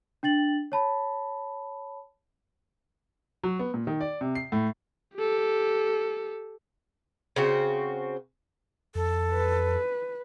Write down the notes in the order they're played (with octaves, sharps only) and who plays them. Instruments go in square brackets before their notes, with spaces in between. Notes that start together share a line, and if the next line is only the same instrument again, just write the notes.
[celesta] D4 G5 A6 F#7
C#5 A5 B5
[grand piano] F#3
B3
A#2
D#3
D5
C3
C7
A2
[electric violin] G4 A4
[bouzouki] C#3 C4 F#4
[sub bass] F2 [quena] A4
[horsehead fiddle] B4